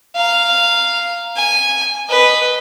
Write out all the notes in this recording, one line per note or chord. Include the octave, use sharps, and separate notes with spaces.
F5 A#5
G#5
B4 D#5